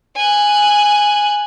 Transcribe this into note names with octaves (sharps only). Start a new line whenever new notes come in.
G#5 F#6